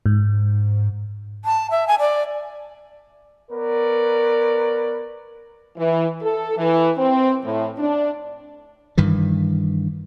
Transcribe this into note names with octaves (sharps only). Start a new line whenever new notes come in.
G#2
A5
E5
G#5
D5
B3 A#4 B4 C#5 D5
E3
A4
E3
C4
A2
D4
G2 D#3 E3